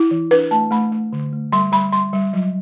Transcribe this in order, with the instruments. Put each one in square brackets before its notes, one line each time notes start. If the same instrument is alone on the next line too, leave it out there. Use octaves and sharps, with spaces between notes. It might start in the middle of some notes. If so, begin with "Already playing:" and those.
Already playing: [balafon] E4
E3
D4 B4
A3 A5
A3 B5
A3
D3
A3
G3 C6
G3 B5
G3 C6
G3
F#3